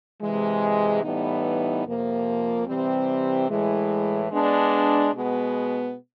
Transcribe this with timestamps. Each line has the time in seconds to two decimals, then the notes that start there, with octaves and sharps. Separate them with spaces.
0.22 C3 E3 G#3
1.03 A2 E3 G3 B3 D#4
1.85 F2 C3 F3 A#3
2.67 C3 E3 G3 C4
3.50 A2 E3 G#3
4.31 G#3 B3 D4
5.13 B2 G#3 B3